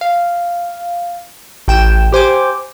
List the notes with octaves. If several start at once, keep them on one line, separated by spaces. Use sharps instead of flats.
F5
A1 G5 E7
G4 C5 G#5 D6